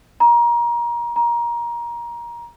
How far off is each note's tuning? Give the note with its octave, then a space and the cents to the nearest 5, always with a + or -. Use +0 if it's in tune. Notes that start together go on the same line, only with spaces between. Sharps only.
A#5 +25
A#5 +20